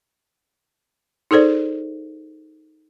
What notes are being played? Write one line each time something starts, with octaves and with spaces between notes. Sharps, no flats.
D#4 G#4 A4 C5 D5